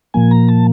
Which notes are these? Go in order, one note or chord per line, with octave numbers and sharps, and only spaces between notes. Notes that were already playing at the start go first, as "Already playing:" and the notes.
A#2 F3 A#3 G#5
A#5
A5